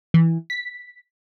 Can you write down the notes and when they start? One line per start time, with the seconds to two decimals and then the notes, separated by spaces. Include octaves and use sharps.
0.14 E3
0.50 B6